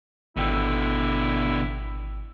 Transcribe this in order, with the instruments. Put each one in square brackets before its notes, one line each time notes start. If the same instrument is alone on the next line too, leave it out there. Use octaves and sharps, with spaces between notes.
[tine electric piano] G#1 G5 E6 [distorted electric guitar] B2 D3 [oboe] E4